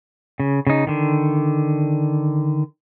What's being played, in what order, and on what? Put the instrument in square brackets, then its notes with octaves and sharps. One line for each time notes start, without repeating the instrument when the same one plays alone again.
[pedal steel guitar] C#3
C#3 D#4
D3 D#3